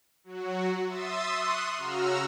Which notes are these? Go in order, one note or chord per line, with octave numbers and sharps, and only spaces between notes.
F#3 F#4
E5 C6 D#6 E6 A6
C6 C#6 D#6 F#6
C#3 F#4 A#5 E6 F6